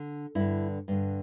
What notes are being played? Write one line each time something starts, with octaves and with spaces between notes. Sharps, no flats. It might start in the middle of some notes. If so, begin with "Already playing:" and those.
Already playing: D3
G2 D3 E4
G2 D3